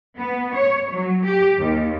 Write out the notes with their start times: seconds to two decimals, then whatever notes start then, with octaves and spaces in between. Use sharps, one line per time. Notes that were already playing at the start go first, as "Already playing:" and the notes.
0.18 B3
0.56 C#5
0.91 F#3
1.26 G4
1.57 D#2